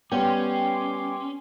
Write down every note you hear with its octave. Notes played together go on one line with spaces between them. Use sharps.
G3 B3 C#4 G5 C6 D6